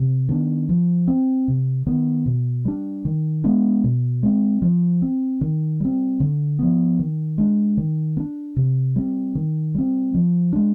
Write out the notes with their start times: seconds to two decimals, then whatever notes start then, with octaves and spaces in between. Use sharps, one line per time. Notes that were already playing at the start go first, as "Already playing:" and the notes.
Already playing: C3
0.29 D#3 B3 D4
0.69 F3
1.08 C4
1.48 C3
1.86 D#3 B3
2.26 B2
2.65 G3 D4
3.05 D#3
3.44 G#3 B3 D4
3.84 B2
4.23 G#3 C4
4.62 F3
5.02 C4
5.41 D#3
5.80 G3 C4
6.20 D3
6.59 F3 B3
6.99 D#3
7.38 G#3 D4
7.77 D#3
8.17 B3
8.20 D4
8.56 C3
8.96 G3 C4
9.35 D#3
9.75 G3 C4
10.14 F3
10.53 G#3 D4